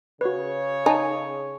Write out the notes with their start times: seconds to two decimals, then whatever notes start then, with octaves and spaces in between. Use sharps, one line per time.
0.21 C#3 F#4 B4 C#5
0.86 D#4 G#5 A5